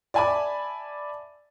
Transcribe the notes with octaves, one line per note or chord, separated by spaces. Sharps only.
D5 E5 G#5 A5 B5 D6